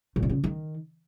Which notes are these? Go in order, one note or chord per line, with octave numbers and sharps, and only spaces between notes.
A#2
C3
C#3
D#3